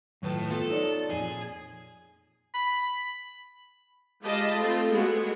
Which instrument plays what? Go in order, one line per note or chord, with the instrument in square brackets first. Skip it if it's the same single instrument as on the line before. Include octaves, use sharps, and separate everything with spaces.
[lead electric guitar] A2 [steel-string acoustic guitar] D#3 B4 A5 [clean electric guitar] F#3 F4
[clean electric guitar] B3 [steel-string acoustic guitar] F4 [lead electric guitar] A4
[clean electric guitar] D#4 C#5 D5
[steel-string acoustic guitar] F2 A#2 [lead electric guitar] G#4
[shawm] B5
[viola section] G#3 F4 G4 D#5 A5 B5
A3 C4 F4
G#3 A3 B3 F#4 G#4